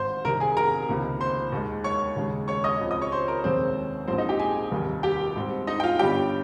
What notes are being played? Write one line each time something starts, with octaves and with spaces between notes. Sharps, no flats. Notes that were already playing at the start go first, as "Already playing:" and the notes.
Already playing: G#1 G#2 D#3 C5 C6
C2 C3 D#3 A#4 A#5
G#4 G#5
A#4 A#5
C#2 C3 D#3 A#3
C5 C6
D#2 D#3 G#3
C#5 C#6
D#2 C#3 G#3
C#5 C#6
D#5 D#6
C#2 C#3 F3 C4
D#5 D#6
C#5 C#6
C5 C6
A#4 A#5
F1 D#2 D#3 G#3 C4 C#4 C5
A#1 G#2 F3 A#3 C4 C5
D#4 D#5
G4 G5
G#4 G#5
F1 D#2 D#3 G3 A#3
G4 G5
G#2 G3 C4
D#4 D#5
G5
F4 F5
G1 G2 G3 C#4 G4 G5